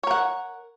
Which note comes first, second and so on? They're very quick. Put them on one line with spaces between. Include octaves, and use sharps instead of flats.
C#5 A#4 F#5